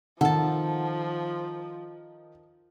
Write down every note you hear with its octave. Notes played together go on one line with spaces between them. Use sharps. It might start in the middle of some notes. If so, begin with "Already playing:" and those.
D#3 F3 A4 F#5 A5